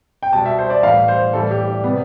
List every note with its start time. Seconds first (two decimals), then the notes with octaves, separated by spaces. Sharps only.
0.23 G5
0.33 B2 G3 A5
0.46 E5
0.58 C5
0.70 D5
0.83 A2 E3 G3 F5
1.08 C5
1.33 A2 E3 G3 A4
1.51 G4
1.67 D4
1.83 C3 G3 B3